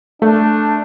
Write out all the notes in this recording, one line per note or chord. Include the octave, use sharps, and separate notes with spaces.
A3 D4